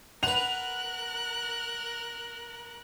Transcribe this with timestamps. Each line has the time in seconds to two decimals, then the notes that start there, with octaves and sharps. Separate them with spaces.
0.23 A#4 B4 F#5 F#6 F7